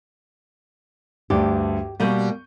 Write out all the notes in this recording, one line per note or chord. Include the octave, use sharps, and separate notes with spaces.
D2 G2 G4 D5
B2 G3 A#3 C#6 G6 D#7